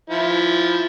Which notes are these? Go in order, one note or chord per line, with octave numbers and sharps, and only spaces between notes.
F3 E4